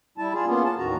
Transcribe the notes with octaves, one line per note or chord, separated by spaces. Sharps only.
G3 E4 A5
F4 G#4
A#3 B3 C#4 F4
A5
D#2 A2 D#3 F#4 A#5